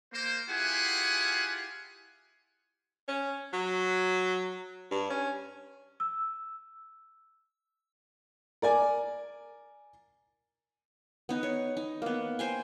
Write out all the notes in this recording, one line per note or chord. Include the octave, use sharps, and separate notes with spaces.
A#3 C5
E4 F4 G4 G#4 F#5 G#5
C#4
F#3
G2
C#4
E6
A#4 D5 G#5
B3 D#4
C#5
D#4
A#3 B3
C5 G5 G#5